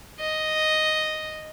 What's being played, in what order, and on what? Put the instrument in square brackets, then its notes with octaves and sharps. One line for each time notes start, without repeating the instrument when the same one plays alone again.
[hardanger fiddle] D#5